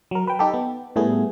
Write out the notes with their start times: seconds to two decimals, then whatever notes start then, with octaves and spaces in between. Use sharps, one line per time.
0.11 F#3 A#4
0.27 B4 G5
0.39 D#4 G4 A4
0.54 B3
0.96 A2 G3 A3 B3 G#4